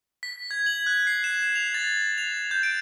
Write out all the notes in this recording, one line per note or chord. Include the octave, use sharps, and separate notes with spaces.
B6
G#6
F#7
F#6
C7
E7
F7
A6
F7
G6
D7